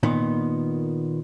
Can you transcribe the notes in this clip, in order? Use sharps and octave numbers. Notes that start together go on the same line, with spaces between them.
A#2 D#3 B3